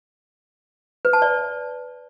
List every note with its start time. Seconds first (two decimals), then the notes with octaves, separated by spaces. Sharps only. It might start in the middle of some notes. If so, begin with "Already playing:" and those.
1.05 B4
1.13 A5
1.22 D5